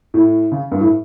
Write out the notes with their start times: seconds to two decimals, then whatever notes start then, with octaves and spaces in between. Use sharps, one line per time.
0.14 A2
0.52 C#3
0.72 G2
0.80 A2